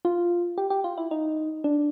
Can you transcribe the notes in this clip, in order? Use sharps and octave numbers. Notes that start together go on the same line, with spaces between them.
F4
G4
G4
F4
E4
D#4
D4